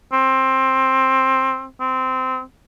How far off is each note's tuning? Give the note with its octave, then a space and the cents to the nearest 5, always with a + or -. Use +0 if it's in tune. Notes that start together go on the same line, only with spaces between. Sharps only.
C4 +15
C4 -15